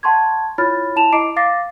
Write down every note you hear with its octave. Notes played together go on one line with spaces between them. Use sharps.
F#5 A5 C6 C#6 G#6
E4 F4 C#5 B5 F6 A6
E4 A5 E7 F7
E4 D#5 A#5 D6 C7 D7
F5 D6 A6 A#6 C7